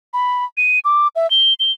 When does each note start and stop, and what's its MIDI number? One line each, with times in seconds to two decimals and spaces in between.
0.13 0.45 83
0.57 0.79 99
0.85 1.08 86
1.16 1.29 76
1.30 1.54 103
1.60 1.72 103